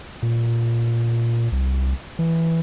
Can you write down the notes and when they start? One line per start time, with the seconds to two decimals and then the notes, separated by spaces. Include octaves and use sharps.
0.23 A#2
1.52 C2
2.19 E3